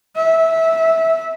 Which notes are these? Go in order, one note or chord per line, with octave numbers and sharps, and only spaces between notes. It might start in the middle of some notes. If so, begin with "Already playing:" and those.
E5